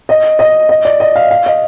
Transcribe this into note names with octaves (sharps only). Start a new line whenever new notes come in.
D#5
D#5
D#5
D5
D#5
F5
F5
D#5